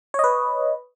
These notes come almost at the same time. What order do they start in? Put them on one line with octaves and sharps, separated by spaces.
C#5 D#5 B4